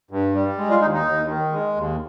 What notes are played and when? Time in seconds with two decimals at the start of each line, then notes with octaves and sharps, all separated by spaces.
0.11 G2
0.35 G3
0.58 G#3
0.70 F4
0.82 D#2 D#4
0.94 D#4
1.06 D#2
1.28 D#3
1.52 G#3
1.76 D#2